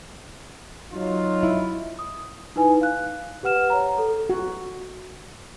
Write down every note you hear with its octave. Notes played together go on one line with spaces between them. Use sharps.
F#3 D#4 F4
E4
D#6
D#4 E4 B4 G#5
F5 F#6
G4 B4 F#5 F6 E7
C#5 A#5
A4
F#4